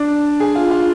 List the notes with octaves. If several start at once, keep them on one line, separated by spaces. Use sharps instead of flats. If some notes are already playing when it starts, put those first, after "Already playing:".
Already playing: D4
G#4
F4
F4